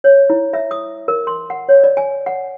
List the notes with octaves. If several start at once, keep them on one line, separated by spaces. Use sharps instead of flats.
C#5
E4
E5
D#6
A#4
C6
F#5
C#5
D5
G#5
F#5